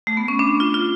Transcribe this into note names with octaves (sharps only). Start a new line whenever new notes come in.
A3
B3
C#4
D4
F4
F4